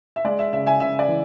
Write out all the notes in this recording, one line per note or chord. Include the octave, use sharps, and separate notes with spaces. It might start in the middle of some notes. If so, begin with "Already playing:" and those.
E5
G#3 D5
E5
C#3 E5
E5 G#5
C#3 E5
D5
E3